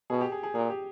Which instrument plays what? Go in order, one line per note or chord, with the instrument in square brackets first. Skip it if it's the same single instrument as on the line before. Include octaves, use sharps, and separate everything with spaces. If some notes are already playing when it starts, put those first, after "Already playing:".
[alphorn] B2 [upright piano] G#4
[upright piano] G4
G#4
G#4
[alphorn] A#2 [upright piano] G#4
[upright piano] G4